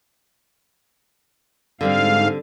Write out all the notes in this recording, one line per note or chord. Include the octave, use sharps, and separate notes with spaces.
G#2 D3 G3 C4 F5